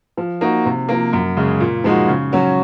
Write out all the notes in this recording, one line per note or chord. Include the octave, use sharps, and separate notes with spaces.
F3
A#3 D#4 F#4
C3
F3 A#3
F#2
C#3 G#3
A#2
F3 G#3 D#4 F#4
C#3
F#3 C#4 F#4